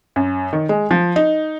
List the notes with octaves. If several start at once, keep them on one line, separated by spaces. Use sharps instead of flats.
F#2
D#3
G#3
F3
D#4